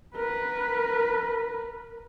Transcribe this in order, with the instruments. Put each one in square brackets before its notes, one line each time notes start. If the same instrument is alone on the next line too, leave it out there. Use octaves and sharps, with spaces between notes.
[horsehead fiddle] A#4 B4